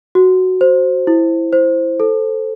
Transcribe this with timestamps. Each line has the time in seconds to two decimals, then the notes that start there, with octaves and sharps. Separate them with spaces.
0.15 F#4
0.61 C5
1.07 E4
1.53 C5
2.00 A4